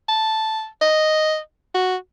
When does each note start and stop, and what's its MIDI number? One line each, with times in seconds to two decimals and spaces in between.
0.09 0.67 81
0.82 1.38 75
1.75 1.96 66